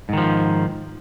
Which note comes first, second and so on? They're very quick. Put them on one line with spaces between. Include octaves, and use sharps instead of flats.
G#2 D#3 F3